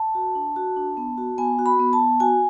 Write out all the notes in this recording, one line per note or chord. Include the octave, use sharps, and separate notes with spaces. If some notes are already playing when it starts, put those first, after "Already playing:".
Already playing: A5
F#4
D4
F#4
D4
B3
F#4
B3 G#5
F#4
B5
B3
A5
B3
F#4 G#5